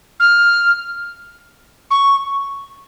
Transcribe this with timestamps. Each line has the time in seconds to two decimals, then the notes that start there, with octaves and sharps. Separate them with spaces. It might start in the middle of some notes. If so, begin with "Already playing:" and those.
0.20 F6
1.91 C#6